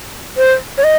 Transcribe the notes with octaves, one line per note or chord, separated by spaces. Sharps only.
C5
C#5
D#5